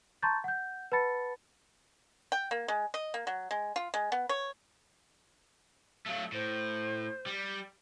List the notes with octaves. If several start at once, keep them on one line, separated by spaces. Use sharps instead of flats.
A5 A#5 C6 C#6 G6 A6
F#5 G6
B4 F#5 A5 B5 A6 C#7
G5
A#3
G#3
D#5
A#3
F#3
G#3
F4
G#3
B3
C#5
F#3 A3 F5
A2 C5
G3